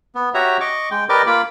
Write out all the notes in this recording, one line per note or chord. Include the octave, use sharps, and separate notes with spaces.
B3
F#4 G4 C#5 E5 A#5
D#5 C#6 D6
G#3 G5
G4 A#4 B4 D5 D#5 D6
A#3 F4 B5 D6